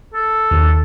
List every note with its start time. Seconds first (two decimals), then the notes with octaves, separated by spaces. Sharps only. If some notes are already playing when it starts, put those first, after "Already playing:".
0.14 A4
0.51 D#2